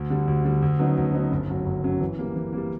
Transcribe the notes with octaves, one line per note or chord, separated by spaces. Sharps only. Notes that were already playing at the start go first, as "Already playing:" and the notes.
Already playing: D2
D3 G3
D2
D3 G3
D2
C#3 F#3 B3 D#4
D2
C#3 F#3 B3 D#4
G1
F#2 C#3 F#3
G1
F#2 C#3 F#3
E3
G3 A#3
E3
G3 A#3